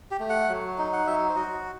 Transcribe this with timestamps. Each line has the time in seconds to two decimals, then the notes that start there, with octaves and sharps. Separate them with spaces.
0.11 G4
0.20 A3
0.29 F#5
0.49 F#3
0.78 D#4
0.93 F#5
1.06 F#3 E5
1.29 C5
1.36 F#4 D#5